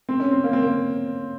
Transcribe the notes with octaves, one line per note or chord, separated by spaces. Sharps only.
C4
C#4
C4
A#3
C4
A#3